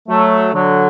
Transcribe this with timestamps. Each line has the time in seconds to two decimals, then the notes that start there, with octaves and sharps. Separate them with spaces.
0.08 F#3 A3
0.53 D3 F#3